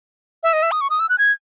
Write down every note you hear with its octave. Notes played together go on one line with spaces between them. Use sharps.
E5
D#5
E5
D#6
C#6
D#6
E6
F#6
G#6